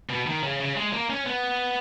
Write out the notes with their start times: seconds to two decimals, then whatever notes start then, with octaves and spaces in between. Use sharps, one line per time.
0.10 B2
0.27 D#3
0.43 C#3
0.60 C#3
0.76 G#3
0.93 A#3
1.10 C#4
1.26 B3